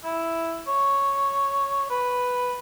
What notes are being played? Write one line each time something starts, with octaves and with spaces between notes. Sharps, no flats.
E4
C#5
B4